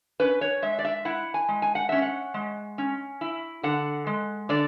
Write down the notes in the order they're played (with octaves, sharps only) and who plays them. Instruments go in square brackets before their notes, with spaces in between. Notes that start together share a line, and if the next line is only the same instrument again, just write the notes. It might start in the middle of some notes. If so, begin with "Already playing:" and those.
[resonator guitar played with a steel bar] C#4 B4
C#5
G#3 E5
D5
E5
E4 F#5
G#5
G#3
G#5
F#5
C#4 E5
F#5
G#3
C#4
E4
D3 F#5
G#3
D3 D5